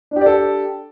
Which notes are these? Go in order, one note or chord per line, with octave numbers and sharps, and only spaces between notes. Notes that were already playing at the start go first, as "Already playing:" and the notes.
D4 G4 A4 D5